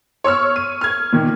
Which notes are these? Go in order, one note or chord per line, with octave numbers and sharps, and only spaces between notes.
C#5 C#6 E6 F6
D#7
F6 G#6
A#2 D#3